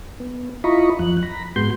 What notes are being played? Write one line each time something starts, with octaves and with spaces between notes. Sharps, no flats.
B3
E4 F4 D#5 A#5 B5 C#6
F2 F3 F#6
A#5 B5
G#2 G#3 B3 F#4 C6 G6